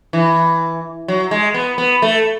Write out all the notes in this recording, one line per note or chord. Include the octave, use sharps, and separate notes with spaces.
E3
F#3
G#3
B3
B3
A3